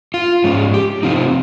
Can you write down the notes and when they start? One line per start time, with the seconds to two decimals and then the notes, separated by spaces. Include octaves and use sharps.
0.14 F4
0.44 G#2 F3 G#3 C#4
0.74 G4
1.03 C3 F3 C4 D#4 F4